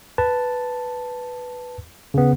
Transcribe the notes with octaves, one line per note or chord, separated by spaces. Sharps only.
B4 A5
C#3 B3